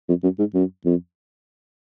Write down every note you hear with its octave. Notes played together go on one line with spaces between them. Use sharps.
F2
F#2
G#2
F#2
F2